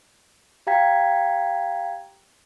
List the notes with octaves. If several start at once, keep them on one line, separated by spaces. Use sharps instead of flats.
G4 F5 G5 A#5 G#6 B6